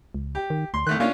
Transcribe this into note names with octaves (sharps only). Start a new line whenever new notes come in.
C#2
G4
D#3
D2 C6
C2 D#3 A3 F#6
A#3 C#4 D4 F4